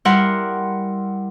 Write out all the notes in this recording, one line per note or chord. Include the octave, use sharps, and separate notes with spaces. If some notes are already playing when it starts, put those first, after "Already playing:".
G3 E4 A#4 F#5 C6